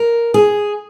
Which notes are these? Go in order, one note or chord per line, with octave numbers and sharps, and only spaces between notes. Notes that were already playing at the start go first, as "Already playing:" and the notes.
Already playing: A#4
G#4